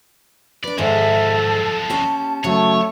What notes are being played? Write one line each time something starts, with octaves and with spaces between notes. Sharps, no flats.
D4 B4 D5
G#2 D#3 F3 G#3 G#4 A4 E5
A5
A#3 C#4 G4
C#3 F#3 A3 C#5